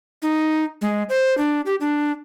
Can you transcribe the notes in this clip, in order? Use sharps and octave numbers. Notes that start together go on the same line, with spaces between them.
D#4
G#3
C5
D4
G4
D4